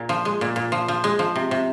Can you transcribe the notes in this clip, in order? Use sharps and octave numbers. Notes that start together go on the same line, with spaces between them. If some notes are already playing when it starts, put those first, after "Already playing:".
Already playing: A#2
F3
G#3
A#2
A#2
F3
F3
G#3
F3
C3
C3